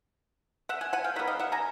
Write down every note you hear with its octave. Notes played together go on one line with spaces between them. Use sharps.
E5 F#5
F#5 G#5
F#5 G#5
F5 G5
D#3 G3 B3 E5 F#5
D#5 F5
E5 F#5
G#5 A#5